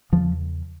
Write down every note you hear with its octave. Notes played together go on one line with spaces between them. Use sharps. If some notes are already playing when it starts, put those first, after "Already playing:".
E2 C#3 F3